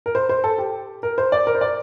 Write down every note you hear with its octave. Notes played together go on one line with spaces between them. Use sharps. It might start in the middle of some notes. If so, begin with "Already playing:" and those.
A#4
C5
C5
A4
G4
A#4
C5
D5
A#4
C5
D5